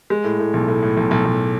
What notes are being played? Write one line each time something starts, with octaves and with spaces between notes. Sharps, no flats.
G#3
A2
A2
B1
A2
A2
B1
B1
B1